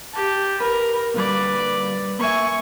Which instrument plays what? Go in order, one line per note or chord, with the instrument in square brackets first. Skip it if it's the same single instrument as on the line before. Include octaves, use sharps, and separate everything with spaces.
[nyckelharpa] G4 A5
[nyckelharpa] A#4 [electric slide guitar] B4
[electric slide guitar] A#2 D3 G3 [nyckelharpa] B4 D5
[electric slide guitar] A#3 E5 [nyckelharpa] G#5 C#6